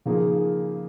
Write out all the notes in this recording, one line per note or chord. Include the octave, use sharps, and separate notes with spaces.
C#3 F3 A#3 D#4 G#4